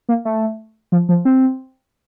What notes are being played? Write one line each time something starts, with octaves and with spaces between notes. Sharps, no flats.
A#3
A3
F3
F3
C4